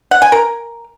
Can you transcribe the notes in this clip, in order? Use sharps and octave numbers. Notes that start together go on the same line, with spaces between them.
F#5
G#5
A#4